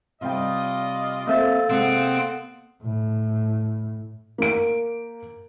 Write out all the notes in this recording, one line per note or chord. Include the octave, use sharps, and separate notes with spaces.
C3 G3 F4 D5 D#5 G5
A#3 C4 A4 E5 A6
C3 G#3 C4 D#5 F5 F#5
A2
A#3 D7